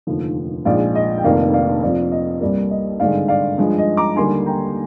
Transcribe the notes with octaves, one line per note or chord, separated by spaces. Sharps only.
F1 D#2 D3 F3
A#1 G#2 F3 G#3 D5 F5
D#5
G5
F1 F2 D#3 A#3 D5 F5
D5 F5
F2 C3 F3 D5 F5
D#5
C2 C3 G3 A#3 D5
D#5
G#1 G2 D3 G#3 D5 F5
D5 F5
G2 F3 G#3
D#5
A#5 D6
D#2 D3 G3 A#3 G#5 C6
G5 A#5